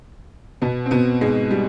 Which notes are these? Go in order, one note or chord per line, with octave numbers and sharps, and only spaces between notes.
B2 B3
C4
B2 B3
G#2 G#3
G3